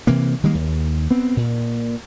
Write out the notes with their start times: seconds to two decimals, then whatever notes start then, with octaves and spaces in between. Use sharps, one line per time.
0.07 C3 E3 A#3
0.43 D#3 G3 G#3 A#3
0.55 D#2
1.11 B3 C4
1.37 A#2